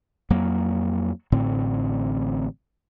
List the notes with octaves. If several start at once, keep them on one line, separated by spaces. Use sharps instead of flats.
F2 F#3 A#3
A1 A2 D3 C4